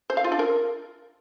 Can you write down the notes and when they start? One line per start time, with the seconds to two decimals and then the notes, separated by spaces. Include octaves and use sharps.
0.10 C5
0.17 F5
0.24 F4
0.32 D4
0.39 A#4